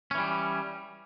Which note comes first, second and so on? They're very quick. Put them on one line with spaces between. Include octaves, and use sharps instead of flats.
C#4 E3 G3